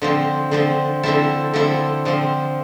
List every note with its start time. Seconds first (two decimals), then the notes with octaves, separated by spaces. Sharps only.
0.02 D3 F3 C4
0.51 D3 F3 C4
1.03 D3 F3 C4 E4 A4
1.54 D3 F3 C4 E4 A4
2.05 D3 F3 C4